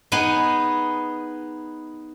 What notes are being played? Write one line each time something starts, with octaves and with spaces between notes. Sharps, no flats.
B3 D#4 G#4